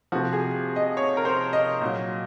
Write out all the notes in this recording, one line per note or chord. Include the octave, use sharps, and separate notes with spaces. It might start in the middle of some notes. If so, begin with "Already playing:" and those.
C3 F3 F#4
G#4
D#5
C#5
A#4
C5
D#5
A#2 F#3